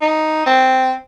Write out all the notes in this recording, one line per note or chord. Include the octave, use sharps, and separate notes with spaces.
D#4
C4